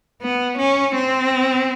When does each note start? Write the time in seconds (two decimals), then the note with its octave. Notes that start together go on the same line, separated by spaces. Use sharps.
0.22 B3
0.58 C#4
0.95 C4